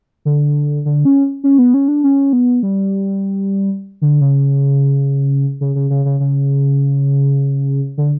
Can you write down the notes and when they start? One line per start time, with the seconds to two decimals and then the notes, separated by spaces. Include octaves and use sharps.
0.25 D3
0.85 D3
1.05 C#4
1.44 C#4
1.58 B3
1.74 C#4
1.88 D4
2.04 C#4
2.33 B3
2.63 G3
4.02 D3
4.21 C#3
5.61 C#3
5.75 C#3
5.90 C#3
6.05 C#3
6.20 C#3
7.98 D3